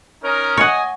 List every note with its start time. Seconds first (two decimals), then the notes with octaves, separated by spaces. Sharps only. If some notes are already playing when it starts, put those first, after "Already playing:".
0.22 C#4 D#4 A#4
0.57 C#5 D#5 F#5 G#5